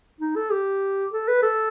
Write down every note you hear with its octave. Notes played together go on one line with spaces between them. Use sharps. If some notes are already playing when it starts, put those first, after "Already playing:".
D#4
A4
G4
A4
B4
A4